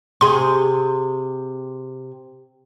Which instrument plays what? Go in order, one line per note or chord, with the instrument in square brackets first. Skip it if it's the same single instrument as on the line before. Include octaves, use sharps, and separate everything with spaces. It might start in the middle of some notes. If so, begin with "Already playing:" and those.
[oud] C3 G#4 [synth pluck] C6